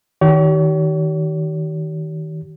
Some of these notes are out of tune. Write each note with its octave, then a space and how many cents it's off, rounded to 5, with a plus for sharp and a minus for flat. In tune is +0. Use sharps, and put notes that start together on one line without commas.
D#3 +20 G4 -35 C#5 +40